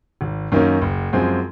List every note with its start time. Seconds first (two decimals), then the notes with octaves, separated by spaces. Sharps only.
0.21 G#1
0.52 F#2 D#3 A#3 C#4
0.82 F#1
1.13 F#2 F3 G#3 C4